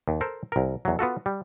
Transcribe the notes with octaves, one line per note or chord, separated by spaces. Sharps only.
D#2
A4 A#4 C5
C2 A#4
E2 F#3
B3 F4 F#4 A4
G3